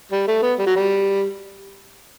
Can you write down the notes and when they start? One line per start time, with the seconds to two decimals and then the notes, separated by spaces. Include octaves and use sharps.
0.12 G3
0.27 A3
0.42 B3
0.58 G3
0.66 F#3
0.76 G3